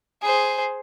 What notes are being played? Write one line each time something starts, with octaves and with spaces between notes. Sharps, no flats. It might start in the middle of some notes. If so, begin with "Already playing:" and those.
G#4 C5